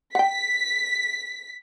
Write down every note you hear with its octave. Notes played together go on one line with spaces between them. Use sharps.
F#5 G5 B6